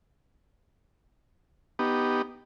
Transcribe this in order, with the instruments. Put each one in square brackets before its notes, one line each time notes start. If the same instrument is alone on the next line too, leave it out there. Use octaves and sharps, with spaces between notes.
[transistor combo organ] B3 D#4 G4